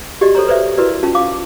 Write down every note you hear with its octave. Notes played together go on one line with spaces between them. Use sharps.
F#4 G4 D5 D#5
A4 C5 C#5 A#5
B4 C5 D5 E5
E4 F#4 A#4 B4 D5
C#4 F4 A5
F5 D6